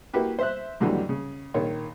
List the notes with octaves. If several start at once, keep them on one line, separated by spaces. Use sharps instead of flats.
A#3 E4 F#4 G4 B4
C5 E5 F#6
D#2 G#2 D3 E3 F#3 G3
C#3
A#1 D#3 C#5